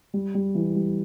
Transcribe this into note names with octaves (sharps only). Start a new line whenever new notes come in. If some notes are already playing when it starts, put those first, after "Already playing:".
G3
G3
E3
G3